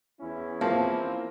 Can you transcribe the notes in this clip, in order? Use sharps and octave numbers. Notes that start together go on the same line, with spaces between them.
E2 C#4 E4
F3 A#3 C4